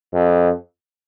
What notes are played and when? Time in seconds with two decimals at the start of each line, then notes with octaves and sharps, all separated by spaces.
0.14 F2